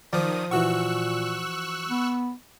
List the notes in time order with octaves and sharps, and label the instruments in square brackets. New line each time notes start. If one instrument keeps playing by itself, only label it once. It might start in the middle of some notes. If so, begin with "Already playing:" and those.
[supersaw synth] D#3 D#6 [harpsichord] F3 [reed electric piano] D5
[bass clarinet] A#2 [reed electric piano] E3 F#4 F#5 [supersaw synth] C#6 E6 F#6
[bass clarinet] B3